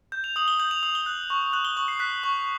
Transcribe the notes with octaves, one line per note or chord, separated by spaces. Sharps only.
G6
F7
D#6 F#7
G7
G6 F#7
F7
D#6 F#7
G7
F#6
C#6
F#6 F#7
G7
C#6 F#7
C7
F#6 B6
C#6